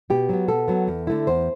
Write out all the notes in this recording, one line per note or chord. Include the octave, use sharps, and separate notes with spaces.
B2 G4
F#3 B3
B2 A4
F#3 B3
E2
D3 A3 E4
E2 C5